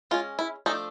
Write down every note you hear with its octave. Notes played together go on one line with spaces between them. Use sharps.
G#3 C#4 F4
E4
F3 A3 D4 D#4